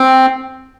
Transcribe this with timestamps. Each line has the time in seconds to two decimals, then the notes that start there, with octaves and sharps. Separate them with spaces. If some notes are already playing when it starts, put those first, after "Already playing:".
Already playing: C4